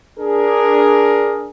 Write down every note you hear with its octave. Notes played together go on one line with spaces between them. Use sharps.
D4 G#4 A#4